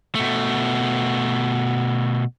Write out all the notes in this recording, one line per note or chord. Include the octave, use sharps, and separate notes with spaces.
B2 A3